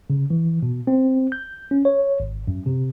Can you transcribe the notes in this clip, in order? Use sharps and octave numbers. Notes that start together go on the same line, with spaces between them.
C#3
E3
B2
C4
G6
C#4
C#5
G#1
F#2
C3